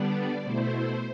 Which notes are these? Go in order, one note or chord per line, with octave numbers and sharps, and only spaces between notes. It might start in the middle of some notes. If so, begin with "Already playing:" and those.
Already playing: D3 G3 B3 D4 D5
B2 A3 E4 C5